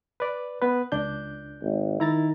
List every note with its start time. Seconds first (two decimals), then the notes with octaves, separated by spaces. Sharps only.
0.20 B4 D5
0.62 B3 B4
0.92 C#2 D4 G6
1.62 G#1
2.00 D#3 E4 A#5 A6